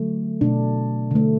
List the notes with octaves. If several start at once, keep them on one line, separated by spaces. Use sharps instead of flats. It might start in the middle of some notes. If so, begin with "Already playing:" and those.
Already playing: D3 F#3 A3
B2 A3 D4
D3 A3